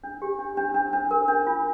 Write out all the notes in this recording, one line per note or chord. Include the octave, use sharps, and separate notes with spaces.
D4
G4
D4
D4
D4
D4
A#4
D4
F4